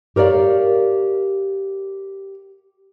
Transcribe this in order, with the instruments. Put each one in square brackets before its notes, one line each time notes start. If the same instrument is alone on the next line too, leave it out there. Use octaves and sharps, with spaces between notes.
[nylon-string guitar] G4 A#4 C#5 D5 F5